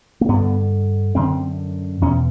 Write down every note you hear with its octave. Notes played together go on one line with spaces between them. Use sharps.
A#3
G2 D3 B3
F#2 D3 C4
E2 B2 C#4